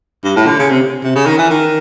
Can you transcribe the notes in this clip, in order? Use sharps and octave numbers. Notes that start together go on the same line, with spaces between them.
G2
A2
D3
C#3
C3
C3
C#3
D#3
E3
D#3